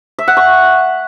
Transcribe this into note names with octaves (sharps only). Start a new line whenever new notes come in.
E5
F#5
C#6